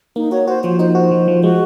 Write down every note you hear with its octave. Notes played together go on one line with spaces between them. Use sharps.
A#3 D#4
F#4 C#5
F#4 C5
F3 C5
D#4 C5
F#4
F3
F3
G#3 F#4